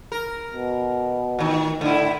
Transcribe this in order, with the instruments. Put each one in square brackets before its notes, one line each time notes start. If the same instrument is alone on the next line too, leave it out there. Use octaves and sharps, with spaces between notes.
[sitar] A#4
[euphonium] B2
[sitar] A2 D#3
[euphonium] A2 [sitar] D3 E4